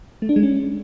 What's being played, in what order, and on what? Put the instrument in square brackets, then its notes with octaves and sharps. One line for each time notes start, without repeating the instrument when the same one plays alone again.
[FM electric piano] A3
D4
G#3
C#4